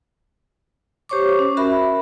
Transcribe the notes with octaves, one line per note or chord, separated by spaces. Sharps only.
G4 C5 C#5 C#6 D6
C#4
F#4 A#4 E5 B5